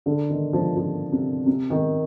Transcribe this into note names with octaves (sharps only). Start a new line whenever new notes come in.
D3
D#3
F3
F3
C3
C3
D#3